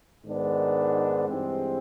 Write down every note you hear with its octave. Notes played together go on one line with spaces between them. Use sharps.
G#2 D#3 G#3 B3 D4
G2 E3 G#3 C4